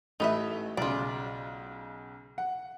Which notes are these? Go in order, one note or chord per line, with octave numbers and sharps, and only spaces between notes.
A1 A3 D#4 B4 E5
B1 C#3 F4 D5
F#5